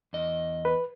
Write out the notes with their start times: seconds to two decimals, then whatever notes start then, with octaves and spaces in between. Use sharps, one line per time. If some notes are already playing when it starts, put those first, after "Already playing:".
0.13 E2 D#5
0.65 B4